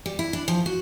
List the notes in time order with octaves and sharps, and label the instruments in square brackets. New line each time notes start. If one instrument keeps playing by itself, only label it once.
[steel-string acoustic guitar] G3
E4
D4
F3
F#4